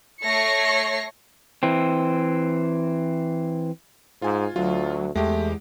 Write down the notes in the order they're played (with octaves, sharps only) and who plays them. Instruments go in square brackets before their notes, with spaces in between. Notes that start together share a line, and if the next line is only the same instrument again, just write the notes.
[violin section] A3 C#5 A#6 C7 C#7
[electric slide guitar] E3 C4
[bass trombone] G#2 [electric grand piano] F4 G#5
[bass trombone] D2 [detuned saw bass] F#3 [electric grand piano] F4
[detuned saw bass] E2 [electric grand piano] G#3 G4 [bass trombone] A3